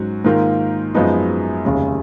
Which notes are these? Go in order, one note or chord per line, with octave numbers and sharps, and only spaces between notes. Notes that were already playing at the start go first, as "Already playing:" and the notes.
Already playing: G#2 F#3 C#4 F#4
G#2 D#3 A#3 F4
F#2 F3 G#3 B3 D#4
F1 D#2 C#3 G#3 C#4